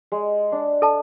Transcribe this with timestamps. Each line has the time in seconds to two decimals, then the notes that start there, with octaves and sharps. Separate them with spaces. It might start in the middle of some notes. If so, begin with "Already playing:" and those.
0.12 G#3
0.52 D4
0.82 A4 A5